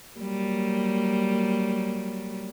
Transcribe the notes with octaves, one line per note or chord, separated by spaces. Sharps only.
F#3 G3 A#3